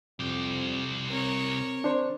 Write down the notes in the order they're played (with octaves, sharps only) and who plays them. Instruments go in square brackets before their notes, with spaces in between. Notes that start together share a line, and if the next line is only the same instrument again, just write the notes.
[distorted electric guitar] C2 G4 [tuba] F2
[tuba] C4 [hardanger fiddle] A#4 C#5
[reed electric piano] D4 C5